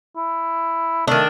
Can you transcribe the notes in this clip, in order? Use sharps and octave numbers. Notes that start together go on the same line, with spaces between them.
E4
D#3 A3 D4